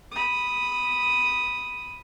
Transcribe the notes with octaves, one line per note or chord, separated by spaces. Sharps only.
B5 D#6